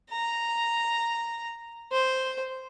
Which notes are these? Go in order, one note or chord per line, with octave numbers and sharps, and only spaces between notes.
A#5
C5